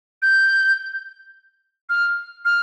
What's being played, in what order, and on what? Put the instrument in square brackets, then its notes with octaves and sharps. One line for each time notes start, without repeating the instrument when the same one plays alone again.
[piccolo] G6
F6
F6